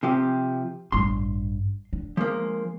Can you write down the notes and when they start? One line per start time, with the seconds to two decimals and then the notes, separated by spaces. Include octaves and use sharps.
0.03 C3 F3 G4
0.92 A1 G2 C6
1.93 D3
2.17 F3 G#3 A#3